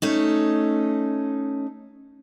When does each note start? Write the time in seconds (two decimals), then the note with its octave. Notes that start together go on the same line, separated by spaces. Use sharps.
0.02 A3 C#4 D#4